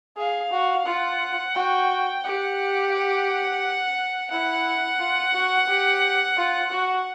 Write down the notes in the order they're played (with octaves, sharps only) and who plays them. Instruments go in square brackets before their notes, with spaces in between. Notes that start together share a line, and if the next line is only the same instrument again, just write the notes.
[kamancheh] G#4 [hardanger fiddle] F5
[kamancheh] F#4
[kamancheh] F4 [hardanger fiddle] F#5
[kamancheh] F#4 [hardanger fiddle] G5
[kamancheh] G4 [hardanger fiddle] F#5
[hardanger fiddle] F#5
[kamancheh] E4 [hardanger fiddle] F#5
[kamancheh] F4
F#4
G4
F4
F#4